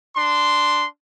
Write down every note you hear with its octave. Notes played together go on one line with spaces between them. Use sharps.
D4 C6